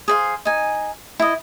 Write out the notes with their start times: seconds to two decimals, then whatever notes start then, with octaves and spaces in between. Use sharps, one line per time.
0.08 G#4 C5 F5
0.45 D#4 G#5
1.20 E4 D#5